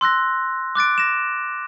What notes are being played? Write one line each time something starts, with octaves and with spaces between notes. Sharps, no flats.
C6 E6 F#6 A#6
D6 F#6 A6 D7
A#6 E7